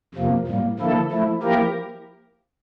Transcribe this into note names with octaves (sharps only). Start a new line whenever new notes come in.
F2 C3 F3 A#3
A2 G3 A#3
D3 F3 A#3 E4 A4
F3 A3 E4
F3 A#3 E4 G4 A#4